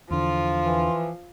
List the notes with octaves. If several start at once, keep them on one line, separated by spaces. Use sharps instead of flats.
E2 D3 F3 F4
E3